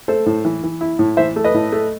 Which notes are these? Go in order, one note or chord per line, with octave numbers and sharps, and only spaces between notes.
A3 A4 C5
A2
E3
E3
E4
A2
E3 C5 E5
A3
B4 D#5
A2
A3